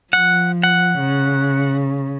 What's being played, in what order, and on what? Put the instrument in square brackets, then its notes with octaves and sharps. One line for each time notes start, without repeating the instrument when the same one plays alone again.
[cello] F3 [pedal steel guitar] F#5
[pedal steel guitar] F#5
[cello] C#3